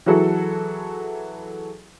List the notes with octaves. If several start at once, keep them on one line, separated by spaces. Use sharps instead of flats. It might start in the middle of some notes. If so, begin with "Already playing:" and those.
E3 F#3 E4 F#4 G#4 A4